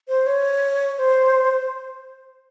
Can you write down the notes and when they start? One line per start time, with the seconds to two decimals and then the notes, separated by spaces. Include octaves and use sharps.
0.08 C5
0.26 C#5
0.98 C5